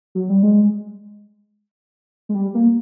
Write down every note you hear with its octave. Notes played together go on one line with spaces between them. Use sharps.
F#3
G3
G#3
G#3
G3
A#3